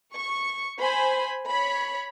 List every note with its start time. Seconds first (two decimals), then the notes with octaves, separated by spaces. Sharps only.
0.15 C#6
0.78 C5 G#5 B5
1.48 C#5 B5